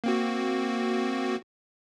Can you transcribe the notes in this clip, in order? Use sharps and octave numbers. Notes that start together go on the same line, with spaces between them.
A#3 C4 F#4